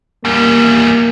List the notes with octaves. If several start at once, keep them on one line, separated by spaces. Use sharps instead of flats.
E2 G3 A#3